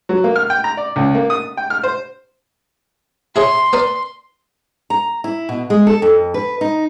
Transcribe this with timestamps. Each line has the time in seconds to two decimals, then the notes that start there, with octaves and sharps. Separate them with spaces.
0.09 F#3
0.24 A#3
0.36 F6
0.50 G5
0.64 A#5
0.77 D5
0.96 C#2
1.15 A#3
1.30 D#6
1.57 G5
1.70 F6
1.83 C5
3.36 E4 G#4 C#5 C6
3.73 B3 A#4 D5
4.90 A#5
5.24 E4
5.49 B2
5.70 G#3
5.87 A4
6.02 F2
6.34 B4
6.61 D#4